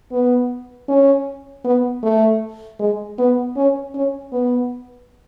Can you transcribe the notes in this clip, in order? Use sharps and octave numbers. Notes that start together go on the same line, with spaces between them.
B3
C#4
B3
A3
G#3
B3
C#4
C#4
B3